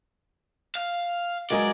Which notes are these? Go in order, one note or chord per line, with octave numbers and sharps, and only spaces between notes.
F5
F#3 G#3 A#4 D5